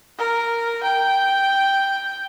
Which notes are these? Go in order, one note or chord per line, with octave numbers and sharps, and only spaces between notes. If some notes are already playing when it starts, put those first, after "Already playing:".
A#4
G5